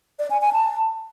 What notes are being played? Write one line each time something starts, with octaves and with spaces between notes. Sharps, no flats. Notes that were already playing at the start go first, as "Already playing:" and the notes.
D5
G#5
G#5
A5